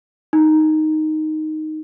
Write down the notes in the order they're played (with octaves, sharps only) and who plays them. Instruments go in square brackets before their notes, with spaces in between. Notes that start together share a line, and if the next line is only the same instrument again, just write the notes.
[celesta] D#4